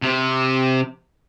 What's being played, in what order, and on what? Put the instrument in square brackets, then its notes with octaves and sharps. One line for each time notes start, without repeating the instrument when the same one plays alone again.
[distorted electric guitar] C3